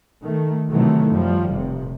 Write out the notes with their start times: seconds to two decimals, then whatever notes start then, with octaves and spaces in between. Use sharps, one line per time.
0.23 D#3 A3
0.71 C3 D#3 E3 F#3 A3
1.11 F#2 F3 G3
1.50 F1 C3